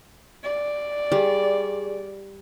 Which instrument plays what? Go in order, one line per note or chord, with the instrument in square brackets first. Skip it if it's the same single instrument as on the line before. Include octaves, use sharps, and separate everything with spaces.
[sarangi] D5
[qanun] G3 [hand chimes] G4 G#4